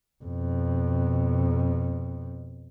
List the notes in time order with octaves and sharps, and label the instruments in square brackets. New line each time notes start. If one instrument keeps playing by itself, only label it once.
[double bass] F2 B2